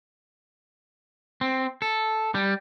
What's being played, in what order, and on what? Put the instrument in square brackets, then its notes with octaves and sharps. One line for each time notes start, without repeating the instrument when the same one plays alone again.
[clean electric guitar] C4
A4
G3